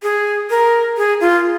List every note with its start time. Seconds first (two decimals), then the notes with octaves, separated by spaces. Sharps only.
0.03 G#4
0.50 A#4
0.97 G#4
1.21 F4